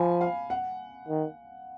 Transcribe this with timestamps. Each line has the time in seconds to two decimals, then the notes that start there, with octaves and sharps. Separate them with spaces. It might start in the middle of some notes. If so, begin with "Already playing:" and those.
Already playing: F3 G#5 B5
0.21 F5
0.50 F#5
1.08 D#3